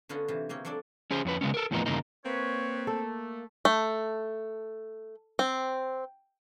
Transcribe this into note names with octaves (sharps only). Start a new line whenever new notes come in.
D3 B3 C#4 F4 F#4
C3 E3 F4
C#3 A#3 C4 C#4
F#3 C4 D4 A4 D5
C#4 G#4 C5
F2 C#4 B4
C#3 G#3 B3 C#4
A4 A#4
E2 A2 F3 A#3 B3 D#4
E2 G2 C#3 A#3 D#4
A#3 C4 B4 C#5
A3 A4
A3
C4